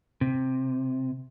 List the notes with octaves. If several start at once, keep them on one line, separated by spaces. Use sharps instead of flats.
C3